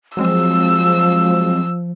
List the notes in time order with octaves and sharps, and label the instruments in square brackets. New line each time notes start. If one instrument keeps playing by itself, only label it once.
[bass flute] F3 [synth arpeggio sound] F#3 G#3 C4 [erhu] E6